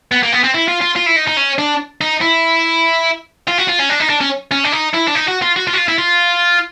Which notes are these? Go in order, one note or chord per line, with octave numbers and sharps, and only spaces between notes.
B3
A#3
B3
C4
E4
F4
F4
F4
E4
D#4
D#4
C#4
D4
D#4
E4
F4
F#4
F4
C#4
D4
D#4
D4
C#4
C#4
D4
D#4
E4
D4
D#4
F#4
F4
F#4
F4
F#4
F4
E4
F4